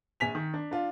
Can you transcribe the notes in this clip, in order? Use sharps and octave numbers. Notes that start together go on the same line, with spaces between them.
A#1 G#5 B6 F7
D#3
D4
D4 F4